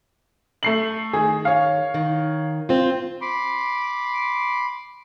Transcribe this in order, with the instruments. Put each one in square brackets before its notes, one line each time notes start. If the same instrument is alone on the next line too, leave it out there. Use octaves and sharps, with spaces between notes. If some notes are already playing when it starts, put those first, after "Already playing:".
[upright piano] A3 C7 F#7
[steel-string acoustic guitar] D#3 [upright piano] G#4
[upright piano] C#5 F5
[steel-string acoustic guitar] D#3
C4 F4
[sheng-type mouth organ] B5 C6 D6